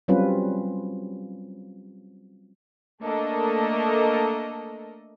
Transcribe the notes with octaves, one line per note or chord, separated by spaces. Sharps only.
F#3 G3 C4 C#4 F4 B4
A3 A#3 D4 A4 A#4 D#5